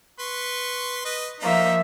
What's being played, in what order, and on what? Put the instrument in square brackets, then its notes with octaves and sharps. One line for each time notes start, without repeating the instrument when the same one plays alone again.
[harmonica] B4 C6 C#6
B4 D#5
[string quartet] F3 A#3 E5 [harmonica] D#4